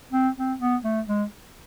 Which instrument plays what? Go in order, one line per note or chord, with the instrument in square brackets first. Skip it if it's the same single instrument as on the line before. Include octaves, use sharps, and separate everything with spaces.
[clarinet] C4
C4
B3
A3
G#3